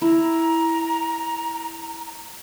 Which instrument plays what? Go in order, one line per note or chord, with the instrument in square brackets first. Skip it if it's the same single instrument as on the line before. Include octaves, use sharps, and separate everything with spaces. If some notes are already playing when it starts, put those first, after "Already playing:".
[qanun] E4 [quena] A#5